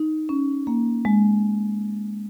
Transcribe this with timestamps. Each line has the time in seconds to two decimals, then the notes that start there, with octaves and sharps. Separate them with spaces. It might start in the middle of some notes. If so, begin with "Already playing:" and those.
Already playing: D#4
0.29 C#4
0.67 A#3
1.05 G#3